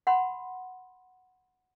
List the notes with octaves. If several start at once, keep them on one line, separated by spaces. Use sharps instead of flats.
F#5 B5 C6